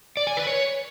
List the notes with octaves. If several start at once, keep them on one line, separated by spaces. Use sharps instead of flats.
D5
G#5
B4
C#5